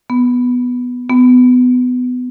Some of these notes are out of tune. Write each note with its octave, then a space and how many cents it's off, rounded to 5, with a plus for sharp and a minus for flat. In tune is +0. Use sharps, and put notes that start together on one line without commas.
B3 +0
B3 +20